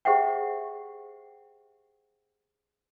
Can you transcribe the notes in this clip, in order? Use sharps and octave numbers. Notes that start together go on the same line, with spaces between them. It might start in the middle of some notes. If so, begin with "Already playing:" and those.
G4 G#4 C5 E5 F#5 G5